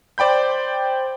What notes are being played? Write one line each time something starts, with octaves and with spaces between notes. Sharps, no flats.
C5 D5 G5 B5 G6